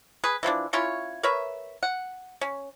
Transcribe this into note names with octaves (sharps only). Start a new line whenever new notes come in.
G#4 B4
E3 F3 A#3 D4
C#4 E4 F4 C#5
A#4 B4 C#5 E5
F#5
C#4